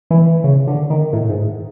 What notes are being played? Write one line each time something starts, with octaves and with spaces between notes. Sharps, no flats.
E3
C#3
D3
D#3
A2
G#2